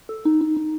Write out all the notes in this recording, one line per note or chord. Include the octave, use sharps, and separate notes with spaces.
A4
D#4
D#4
D#4